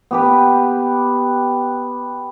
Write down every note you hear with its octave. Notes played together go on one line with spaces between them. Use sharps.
B3 G4 B4